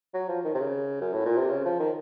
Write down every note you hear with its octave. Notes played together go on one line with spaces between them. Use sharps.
F#3
F3
D#3
C3
C#3
F#2
A2
A#2
C3
C#3
F3
D#3